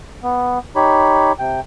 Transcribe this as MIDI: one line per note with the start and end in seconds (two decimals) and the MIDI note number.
0.23 0.59 59
0.76 1.32 63
0.76 1.32 67
0.76 1.32 73
0.76 1.32 83
1.39 1.60 48
1.39 1.60 79